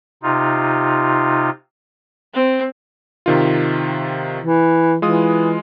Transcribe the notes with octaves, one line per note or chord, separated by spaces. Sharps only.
C3 D#4 F4
C4
C3 D#3 F4
E3
E3 G#3 F4 D#6